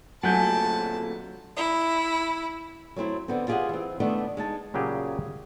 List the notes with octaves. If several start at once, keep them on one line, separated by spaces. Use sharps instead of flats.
D2 A#2 F#3 A3 F#5 G#5 A5 G6
E4
F#3 A3 C4 E4
D3 B3 C4
F4 G4 G#4 D5 D#5 F#5
E3 C4
D#3 A3 B3 D4 D#5
G#3 D#4 A5
A#2 C#3 F#3 G4 G#4